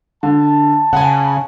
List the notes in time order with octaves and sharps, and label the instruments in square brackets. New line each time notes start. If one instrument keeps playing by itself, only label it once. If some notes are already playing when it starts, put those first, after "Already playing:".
[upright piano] D3 [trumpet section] A5
[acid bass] C#3 [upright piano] F#5 G#5